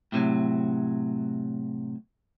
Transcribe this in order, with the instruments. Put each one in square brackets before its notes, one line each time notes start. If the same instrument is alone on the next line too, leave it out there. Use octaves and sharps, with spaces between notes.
[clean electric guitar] A2 C3 E3 F#3